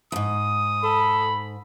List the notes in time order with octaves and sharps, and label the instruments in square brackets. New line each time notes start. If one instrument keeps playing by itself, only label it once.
[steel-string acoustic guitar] E2 G#2 [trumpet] D#6
[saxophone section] A4 [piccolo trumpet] B5